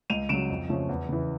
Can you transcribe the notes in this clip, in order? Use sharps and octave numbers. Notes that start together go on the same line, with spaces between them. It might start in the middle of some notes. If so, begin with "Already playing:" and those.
C#2 D#7 F7
C#3 F#3 D7 E7
F2
C#3 F3 A3 C#4
E2
C#3 E3